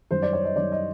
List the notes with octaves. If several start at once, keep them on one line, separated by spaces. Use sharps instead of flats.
F#2 D#3 G3 C5
D5
C#5
D#5
F#2 D#3 G3 D5
D#5